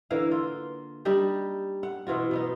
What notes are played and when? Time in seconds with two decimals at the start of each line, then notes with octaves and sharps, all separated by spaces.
0.10 D3 E3 A#3 F5
0.31 F4
1.05 G3 D4 D#4 G4
1.83 F#5
2.07 B2 E3 F4 F#4
2.31 B2 B3 D#4